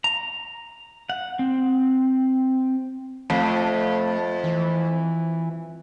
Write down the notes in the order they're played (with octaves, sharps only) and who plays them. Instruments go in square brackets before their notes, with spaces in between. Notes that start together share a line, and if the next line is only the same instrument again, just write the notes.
[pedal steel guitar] A#5
F#5
C4
[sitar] F2 [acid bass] A3
[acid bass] E3